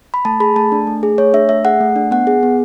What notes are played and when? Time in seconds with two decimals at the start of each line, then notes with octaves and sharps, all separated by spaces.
0.14 B5
0.25 A3 A5
0.40 G#4 B5
0.56 A3 A5
0.72 D4
0.87 A3
1.03 G#4
1.18 A3 C#5
1.34 D4 E5
1.49 A3 E5
1.65 G#4 F#5
1.80 A3
1.96 D4
2.11 B3 F#5
2.27 G#4
2.43 B3